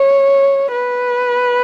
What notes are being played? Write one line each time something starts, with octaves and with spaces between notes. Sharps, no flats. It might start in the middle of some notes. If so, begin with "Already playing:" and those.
Already playing: C#5
B4